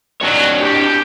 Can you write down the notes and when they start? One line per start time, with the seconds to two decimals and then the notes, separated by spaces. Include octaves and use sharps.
0.21 G2 D#3 F#3 D4 C#5
0.59 B2 D#3 G4